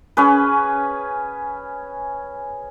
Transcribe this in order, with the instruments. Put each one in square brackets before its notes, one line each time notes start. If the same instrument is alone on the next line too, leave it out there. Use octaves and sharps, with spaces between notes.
[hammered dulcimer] C#4 G#4 B4